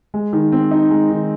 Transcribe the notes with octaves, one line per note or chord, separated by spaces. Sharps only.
G#3
D#3
C4
D#4
G#3
D#3